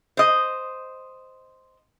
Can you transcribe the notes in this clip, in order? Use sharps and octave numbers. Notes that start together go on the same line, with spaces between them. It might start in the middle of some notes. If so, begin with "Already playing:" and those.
C5 D#5